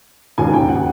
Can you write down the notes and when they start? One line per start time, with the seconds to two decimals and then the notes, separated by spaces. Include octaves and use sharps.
0.38 E1 D#2 C#3 G#5
0.54 G5
0.69 F#5